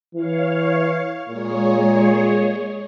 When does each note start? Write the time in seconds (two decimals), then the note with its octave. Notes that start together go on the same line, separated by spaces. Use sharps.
0.15 E3 C#5 F5
1.29 A#2 G#3 G#4 C#5